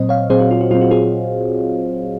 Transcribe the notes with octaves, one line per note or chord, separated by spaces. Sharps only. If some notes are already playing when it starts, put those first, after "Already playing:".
Already playing: A#2 F#3 C4 C5 D#5
C#5 F5
A#2 F#3 C4 G#4 C5
F#4
F4
F#4
A#2 F#3 C4 F4
F#4
F4 G#4